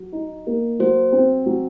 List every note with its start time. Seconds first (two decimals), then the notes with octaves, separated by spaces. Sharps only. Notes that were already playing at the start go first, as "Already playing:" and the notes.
Already playing: F#3
0.12 D#4
0.47 A#3
0.79 F#3 C5
1.12 C4
1.46 F#3